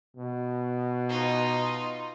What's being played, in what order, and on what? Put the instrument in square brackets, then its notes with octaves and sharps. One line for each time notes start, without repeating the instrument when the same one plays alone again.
[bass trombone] B2
[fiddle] D#4 F4